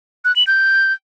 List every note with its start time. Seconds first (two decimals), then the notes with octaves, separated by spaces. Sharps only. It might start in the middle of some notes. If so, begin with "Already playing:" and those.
0.25 F#6
0.36 F#7
0.47 G6